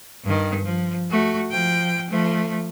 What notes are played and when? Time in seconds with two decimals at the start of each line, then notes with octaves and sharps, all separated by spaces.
0.24 G2 D#3
0.65 F3
1.10 A3 F#4
1.51 F3 G5
2.10 F3 A3